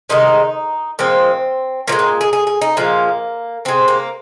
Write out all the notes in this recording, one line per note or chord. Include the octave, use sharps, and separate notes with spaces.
C3 D#3 G#3 D#4
A#2 F3 G#3 C4
A#2 F3 G#3 A#3
C4
G#4
G#4
G#4
D#4
A#2 F3 G#3 A#3
C3 G#3 C4
A#3